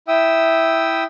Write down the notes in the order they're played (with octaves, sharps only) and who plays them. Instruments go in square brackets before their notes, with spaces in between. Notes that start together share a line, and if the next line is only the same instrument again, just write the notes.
[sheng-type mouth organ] E4 E5 G5 D#6 E6